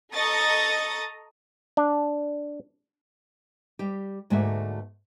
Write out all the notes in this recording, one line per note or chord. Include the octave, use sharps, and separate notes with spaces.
A4 D#5 A#5 C#6 D#6 A6
D4
G3 G4
D2 G#2 A3 A#3 F#4 E5